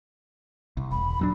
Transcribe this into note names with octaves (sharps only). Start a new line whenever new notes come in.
C2
E1 B5
D#1 F#3 D4